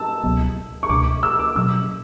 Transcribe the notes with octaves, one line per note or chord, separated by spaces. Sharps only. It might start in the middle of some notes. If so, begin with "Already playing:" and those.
Already playing: A5 E6
C#2 B2 F#3 B3
C#6
C#2 B2 A3 D4 D6
E6
D6
B2 F#3 C#4 E6